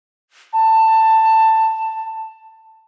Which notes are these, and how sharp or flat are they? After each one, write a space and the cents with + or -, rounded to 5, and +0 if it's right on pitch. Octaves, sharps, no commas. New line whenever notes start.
A5 +15